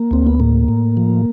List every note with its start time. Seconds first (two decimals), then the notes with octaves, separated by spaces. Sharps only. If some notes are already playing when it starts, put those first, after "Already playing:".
Already playing: A#3
0.11 D2 C4
0.27 B3
0.40 A2 A#3
0.68 A2
0.97 F3